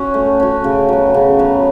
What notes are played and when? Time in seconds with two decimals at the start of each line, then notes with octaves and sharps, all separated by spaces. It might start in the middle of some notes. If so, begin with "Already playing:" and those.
Already playing: C#4 F#4
0.14 A3
0.40 C#4 F#4
0.64 C#3
0.89 F#3 B3
1.14 C#3
1.39 F#3 B3